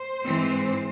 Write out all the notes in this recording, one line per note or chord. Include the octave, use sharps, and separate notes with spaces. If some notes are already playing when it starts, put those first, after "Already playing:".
Already playing: C5
G#2 E3 G#3 C4